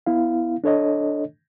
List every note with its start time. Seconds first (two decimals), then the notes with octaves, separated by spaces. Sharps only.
0.06 B3 E4 F5
0.64 D4 A4 C#5 D#5